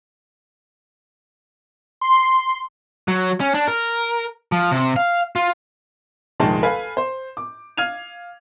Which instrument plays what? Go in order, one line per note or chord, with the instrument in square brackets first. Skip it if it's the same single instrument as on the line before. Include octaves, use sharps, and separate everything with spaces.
[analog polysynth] C6
[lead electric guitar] F#3
C#4
D4
A#4
F3
C3
F5
F4
[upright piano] F1 A#1 D#3 G#3 A5
A4 B4 F5 G#5
C5
D6
F5 F6 G#6 D#7 F7